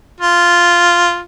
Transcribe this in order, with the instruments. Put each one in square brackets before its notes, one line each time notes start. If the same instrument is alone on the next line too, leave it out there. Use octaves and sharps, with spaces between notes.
[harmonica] F4